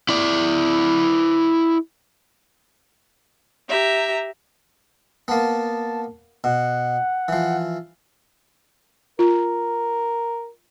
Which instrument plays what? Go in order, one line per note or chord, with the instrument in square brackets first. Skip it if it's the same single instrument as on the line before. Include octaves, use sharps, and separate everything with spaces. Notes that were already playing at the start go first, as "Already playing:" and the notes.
[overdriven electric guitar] E4 D5
[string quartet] G4 E5 A#5
[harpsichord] A#3 B3 [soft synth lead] A5
[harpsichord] B2 [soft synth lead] F#5
[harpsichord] E3 F3
[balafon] F4 [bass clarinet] A#4